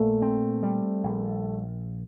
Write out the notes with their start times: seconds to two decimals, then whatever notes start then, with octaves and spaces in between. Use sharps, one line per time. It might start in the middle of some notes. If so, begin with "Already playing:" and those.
Already playing: A#1 A#2 A3
0.22 C4
0.63 G3
1.04 A#1